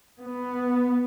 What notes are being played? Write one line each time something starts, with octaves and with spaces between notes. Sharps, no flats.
B3